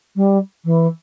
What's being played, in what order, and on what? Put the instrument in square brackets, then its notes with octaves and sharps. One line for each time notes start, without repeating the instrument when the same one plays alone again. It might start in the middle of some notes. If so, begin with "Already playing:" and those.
[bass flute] G3
E3